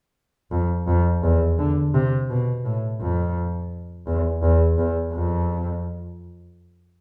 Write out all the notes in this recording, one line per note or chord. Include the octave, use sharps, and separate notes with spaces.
F2
F2
E2
D3
C3
B2
A2
F2
E2
E2
E2
F2